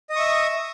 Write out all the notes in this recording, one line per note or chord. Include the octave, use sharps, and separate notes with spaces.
D#5 E5 C#6 D#6